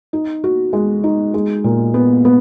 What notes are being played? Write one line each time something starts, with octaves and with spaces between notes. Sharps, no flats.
D#4
F#4
G#3
D#4
G#3
A#2
B3
B3